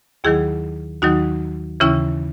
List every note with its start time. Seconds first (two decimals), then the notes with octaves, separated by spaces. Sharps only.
0.24 D#2 D#3 F#3 E4 G#4
1.02 D#2 D#3 F#3 D#4 F#4
1.80 D#2 C#3 E3 C#4 E4